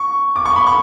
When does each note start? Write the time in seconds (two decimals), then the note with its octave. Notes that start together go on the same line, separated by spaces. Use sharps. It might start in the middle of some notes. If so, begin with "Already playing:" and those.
Already playing: C#6
0.36 D6
0.45 C#6
0.56 B5
0.67 C#6